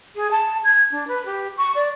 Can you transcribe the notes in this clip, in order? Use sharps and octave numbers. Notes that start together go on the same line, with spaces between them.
G#4
A5
G#6
D4
B4
G4
C#6
D5